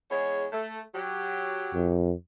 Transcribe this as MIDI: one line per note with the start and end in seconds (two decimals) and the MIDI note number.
0.10 0.45 40
0.10 0.45 56
0.10 0.45 73
0.51 0.79 57
0.93 1.97 54
0.93 1.97 67
1.74 2.14 41